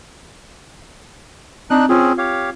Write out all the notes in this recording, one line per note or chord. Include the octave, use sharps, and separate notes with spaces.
C4 D4 D#4 F#6
C4 C#4 F4 G#4
G4 C#5 F5